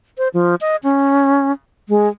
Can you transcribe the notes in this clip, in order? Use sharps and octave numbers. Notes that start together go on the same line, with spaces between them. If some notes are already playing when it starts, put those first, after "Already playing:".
C5
F3
D#5
C#4
G#3